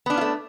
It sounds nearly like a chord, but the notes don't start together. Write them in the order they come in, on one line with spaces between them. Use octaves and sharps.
B3 D4 C#4 F4 A3